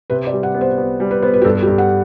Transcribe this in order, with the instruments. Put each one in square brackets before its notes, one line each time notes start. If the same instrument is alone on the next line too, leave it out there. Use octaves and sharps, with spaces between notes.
[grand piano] C3 [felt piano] B4
[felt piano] D5
[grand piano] G3
[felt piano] F#5
[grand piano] B3
[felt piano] C5
[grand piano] B3
G3
[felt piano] B4
[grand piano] B3 [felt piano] C5
[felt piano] B4
G4
[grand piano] G2 [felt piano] A4
[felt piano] A4
G4
[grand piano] G2
[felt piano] F#5